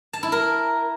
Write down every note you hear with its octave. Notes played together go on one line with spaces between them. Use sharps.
A5
E4
A#4